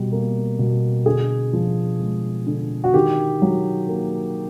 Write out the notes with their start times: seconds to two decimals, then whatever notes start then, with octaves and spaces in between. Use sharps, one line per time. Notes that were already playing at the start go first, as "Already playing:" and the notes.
Already playing: B2 G3
0.12 A#3
0.59 B2
1.05 D3 G#4
1.53 F3
2.00 G#3
2.47 D3
2.84 F#4
2.94 D#3 G4
3.42 F#3
3.88 A#3